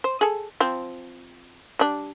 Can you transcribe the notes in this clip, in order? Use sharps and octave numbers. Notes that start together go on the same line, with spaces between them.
C5
G#4 A4
F3 C4
G3 D4